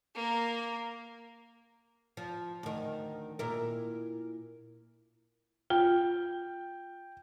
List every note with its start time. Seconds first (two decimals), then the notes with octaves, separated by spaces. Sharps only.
0.15 A#3 A#4
2.17 F3
2.63 D2 D#3
3.39 A#2 E4 A#4
5.70 F4 G5